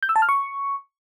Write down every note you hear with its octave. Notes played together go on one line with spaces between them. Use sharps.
G6
E6
A5
F6
C#6